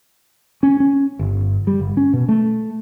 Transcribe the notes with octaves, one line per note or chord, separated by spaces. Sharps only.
C#4
C#4
G1
G3
G1
C#4
B2
A3